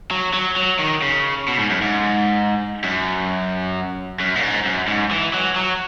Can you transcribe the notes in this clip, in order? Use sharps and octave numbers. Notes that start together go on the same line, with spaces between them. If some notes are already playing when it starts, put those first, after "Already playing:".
F#3
F#3
F#3
D#3
C#3
B2
G#2
F#2
G#2
F#2
F#2
A#2
G#2
F#2
G#2
E3
F#3
F#3